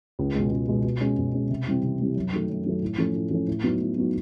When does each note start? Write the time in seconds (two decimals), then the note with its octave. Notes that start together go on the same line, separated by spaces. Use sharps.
0.19 C#2
0.35 B2 G#3
0.52 C#2
0.69 B2 G#3
0.84 B2
1.00 G#3 C#4
1.18 B2
1.34 G#3 C#4
1.50 C3
1.67 E3 G3 C4
1.83 C3
2.00 E3 G3 C4
2.16 F#2
2.33 D#3 F#3 A3
2.49 F#2
2.66 D#3 F#3 A3
2.82 A2
2.98 F3 A3 C#4
3.14 A2
3.31 F3 A3 C#4
3.47 A2
3.64 F#3 B3 D#4 F#4
3.80 A2
3.97 F#3 B3 D#4 F#4